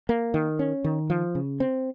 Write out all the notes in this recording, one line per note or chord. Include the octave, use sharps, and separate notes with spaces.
A#3
D#3
C#4
D#3
F3
C#3
C4